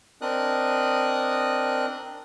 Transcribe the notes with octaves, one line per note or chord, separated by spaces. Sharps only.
C4 D4 A#4 D#5 D#6 F#6